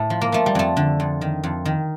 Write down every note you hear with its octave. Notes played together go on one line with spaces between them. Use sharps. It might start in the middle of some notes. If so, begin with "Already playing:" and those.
Already playing: A2 A3
F3
A#3
F3 A3
G3
F2 A3
D3
F2
D#3
F2
D#3